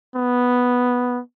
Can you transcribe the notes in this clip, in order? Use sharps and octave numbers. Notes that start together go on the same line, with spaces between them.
B3